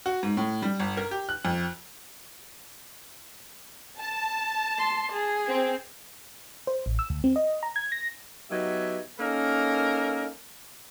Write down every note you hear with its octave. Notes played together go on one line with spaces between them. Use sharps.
F#4
G#2
A2
G3
G1
A#4
G4
F#6
F2
A5
C6
G#4
C4
C5
A1
E6
D2
C4
D#5
A#5
G#6
A#6
F#3 B3 D#4 G4 E5
A#3 C#4 D#4 A4 A#4